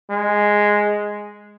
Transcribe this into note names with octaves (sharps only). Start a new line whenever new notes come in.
G#3